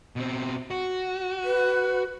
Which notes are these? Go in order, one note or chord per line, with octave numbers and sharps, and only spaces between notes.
B2 C4
F#4
B4